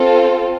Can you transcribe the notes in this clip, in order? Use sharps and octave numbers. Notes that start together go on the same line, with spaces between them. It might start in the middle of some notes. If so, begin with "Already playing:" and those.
Already playing: C4 F4 A4